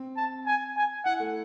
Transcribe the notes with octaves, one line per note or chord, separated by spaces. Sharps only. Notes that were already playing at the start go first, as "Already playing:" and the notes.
Already playing: C4
A5
G#5
G#5
E4 F#5
A3